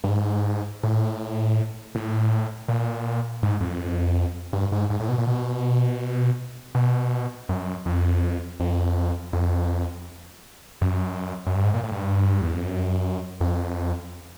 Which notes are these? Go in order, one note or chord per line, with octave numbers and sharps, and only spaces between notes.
G2
G#2
A2
A2
A#2
G#2
F2
G2
G#2
G#2
A2
B2
A#2
B2
B2
F#2
F2
F2
F2
F#2
F#2
G2
G#2
A#2
A2
G2
E2
F2
F#2
F2